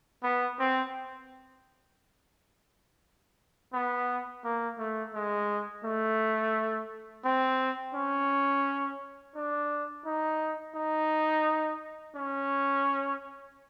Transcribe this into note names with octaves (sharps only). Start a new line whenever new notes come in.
B3
C4
B3
A#3
A3
G#3
A3
C4
C#4
D4
D#4
D#4
C#4